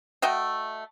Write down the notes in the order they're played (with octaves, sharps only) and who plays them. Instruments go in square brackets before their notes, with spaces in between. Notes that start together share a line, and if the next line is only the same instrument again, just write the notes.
[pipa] A3 F#4 D#5 G5